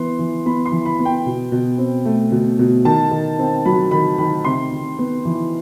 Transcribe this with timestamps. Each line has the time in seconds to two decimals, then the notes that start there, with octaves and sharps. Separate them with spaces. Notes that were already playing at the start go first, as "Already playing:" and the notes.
Already playing: E3 B3 C6
0.19 E3
0.46 B3 B5
0.66 C6
0.72 E3
0.85 B5
0.99 B3
1.05 G5
1.26 B2
1.52 B2
1.78 C4
2.05 A3
2.32 B2
2.59 B2
2.85 D#3 A5
3.11 D#3
3.39 C4
3.65 F#3 B5
3.91 D#3 B5
4.18 D#3 B5
4.45 C3 C6
4.72 C3
4.99 B3
5.25 E3